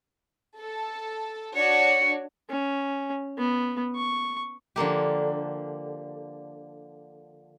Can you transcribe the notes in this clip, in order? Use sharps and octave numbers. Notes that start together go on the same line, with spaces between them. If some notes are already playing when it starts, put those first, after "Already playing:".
A4
D4 F#4 C#5 C#7
C#4
B3
C#6
D3 F3 A#3 G4